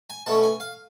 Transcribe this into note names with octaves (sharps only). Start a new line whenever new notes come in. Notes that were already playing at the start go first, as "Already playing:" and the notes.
G#5
B2 A3 C#4 A5
G#5
F5